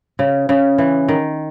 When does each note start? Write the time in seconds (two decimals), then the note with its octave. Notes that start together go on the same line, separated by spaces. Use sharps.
0.19 C#3
0.49 C#3
0.78 E3
1.08 D#3